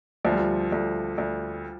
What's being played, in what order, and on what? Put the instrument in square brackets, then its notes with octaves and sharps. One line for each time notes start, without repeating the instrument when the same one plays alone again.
[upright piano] D2 [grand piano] F3
[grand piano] G3
F3
[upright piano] D2
D2